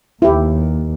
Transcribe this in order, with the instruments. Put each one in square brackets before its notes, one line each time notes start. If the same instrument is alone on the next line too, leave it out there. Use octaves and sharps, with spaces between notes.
[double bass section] D#2 [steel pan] E4 G4